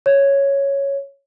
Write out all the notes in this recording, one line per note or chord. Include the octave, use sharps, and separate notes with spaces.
C#5